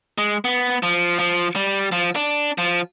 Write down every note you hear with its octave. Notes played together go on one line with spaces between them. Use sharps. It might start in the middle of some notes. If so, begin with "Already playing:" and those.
G#3
B3
F3
F3
G3
F3
D4
F3